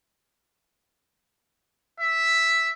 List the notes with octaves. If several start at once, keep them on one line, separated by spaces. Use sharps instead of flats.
E5